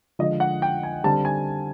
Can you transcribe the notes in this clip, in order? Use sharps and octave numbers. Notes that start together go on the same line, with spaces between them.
D3 F3 G#3 D#5
F#5
G5
G#5
D3 G3 C4 A5
G#5